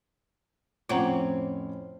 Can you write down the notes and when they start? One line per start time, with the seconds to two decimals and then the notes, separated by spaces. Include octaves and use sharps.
0.89 F2 A2 C4 C#4 F4 C#5 F#5 A#5